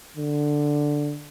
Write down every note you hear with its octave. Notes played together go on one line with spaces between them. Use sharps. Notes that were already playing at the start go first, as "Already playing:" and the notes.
D3